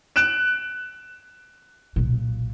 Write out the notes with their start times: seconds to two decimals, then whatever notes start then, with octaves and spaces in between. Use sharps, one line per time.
0.16 F#6 D7 E7
1.96 B1 A#2